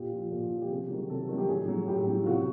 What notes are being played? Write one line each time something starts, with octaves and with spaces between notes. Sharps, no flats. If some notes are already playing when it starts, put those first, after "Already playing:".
Already playing: A#2 G4
F3
A#2
F3
G4
C3 G#4
D#3 F#3
C3 A4
D#3 F#3
G4
A2 G#4
F#3
A2 G4
F#3
F4
C3 F#4